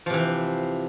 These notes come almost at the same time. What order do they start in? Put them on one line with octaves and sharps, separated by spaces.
F3 C3 E3